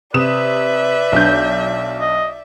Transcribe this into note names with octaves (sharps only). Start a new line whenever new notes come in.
C3 B4 D5 E5 D#6 E7
B1 D4 G6
D#5